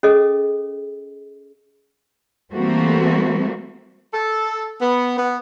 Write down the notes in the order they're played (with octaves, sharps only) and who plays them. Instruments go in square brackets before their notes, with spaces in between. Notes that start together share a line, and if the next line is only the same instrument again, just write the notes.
[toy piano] C#4 G#4 A4 D#5
[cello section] E3 G3 A3 A#3 C4 F#4
[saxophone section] A4
B3
B3